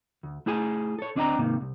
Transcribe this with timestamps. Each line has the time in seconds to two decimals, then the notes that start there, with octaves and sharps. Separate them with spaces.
0.23 D2
0.46 A3 E4 G#4 G#5
0.99 A4 C#5
1.15 D2 C4 D4 D#5 G5 A#5
1.39 G#2 C3 D#3 A#3
1.61 C2